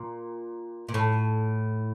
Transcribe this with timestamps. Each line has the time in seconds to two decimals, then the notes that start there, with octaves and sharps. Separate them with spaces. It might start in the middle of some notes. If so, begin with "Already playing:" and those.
Already playing: A#2
0.89 A#2
0.94 A2